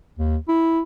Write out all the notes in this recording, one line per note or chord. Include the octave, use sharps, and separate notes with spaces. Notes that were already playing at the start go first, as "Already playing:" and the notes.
D#2
E4